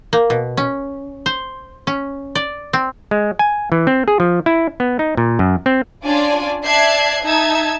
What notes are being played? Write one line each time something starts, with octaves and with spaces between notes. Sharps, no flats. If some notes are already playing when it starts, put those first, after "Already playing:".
A#3
B2
C#4
C5
C#4
D5
C4
G#3
G#5
E3
C4
G#4
F3
E4
B3
D#4
A#2
F#2
C4
C#4 D4 F4 D5 G#5
D5 E5 A5 F#6 G#6 C7
D#4 E5 A5 E6 G#6